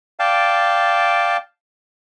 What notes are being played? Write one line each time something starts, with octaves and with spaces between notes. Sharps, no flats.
D5 F5 G5 A5